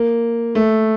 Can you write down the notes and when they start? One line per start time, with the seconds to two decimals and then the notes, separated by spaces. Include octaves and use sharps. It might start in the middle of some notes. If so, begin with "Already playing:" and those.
Already playing: A#3
0.55 A3